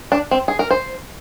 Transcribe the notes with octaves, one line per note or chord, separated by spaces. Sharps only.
D4
C4
G#4
A#4
C5